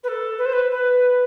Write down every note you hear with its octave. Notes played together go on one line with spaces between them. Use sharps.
B4
A4
B4
C5
B4
B4